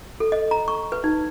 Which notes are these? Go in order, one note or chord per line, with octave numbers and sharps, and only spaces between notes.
A4
D#5
A#5
C#6
B4
D#4